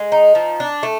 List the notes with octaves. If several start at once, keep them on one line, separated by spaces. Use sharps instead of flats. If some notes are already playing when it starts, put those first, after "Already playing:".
Already playing: G#3
D#4
F3
D4
A3